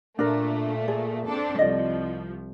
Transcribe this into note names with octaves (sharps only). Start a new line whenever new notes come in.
A#2 A3 D4 A#4
G#4 D5
C4 D4 A4
C2 F3 D5 D#5